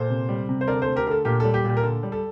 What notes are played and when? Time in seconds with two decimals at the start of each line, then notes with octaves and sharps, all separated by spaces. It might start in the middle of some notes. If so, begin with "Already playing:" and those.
Already playing: A#2 A4 C5
0.10 C3
0.29 G3
0.49 C3
0.61 C5
0.68 D3 A#4 D5
0.82 A4 C5
0.87 A3
0.96 G4 A#4
1.07 D3 A#4
1.11 A4
1.25 A#2 G4 A#4
1.40 G3 A4
1.54 G4
1.64 A#2
1.69 G4
1.77 A#4
1.83 D3 A4
2.03 G3
2.12 A4